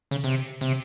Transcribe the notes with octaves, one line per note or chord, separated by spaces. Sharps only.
C#3
C3
C3